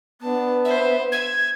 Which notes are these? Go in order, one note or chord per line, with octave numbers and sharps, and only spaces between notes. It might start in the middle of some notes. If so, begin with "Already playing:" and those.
B3 D4 A5
B4 C5 E5
E5 G#6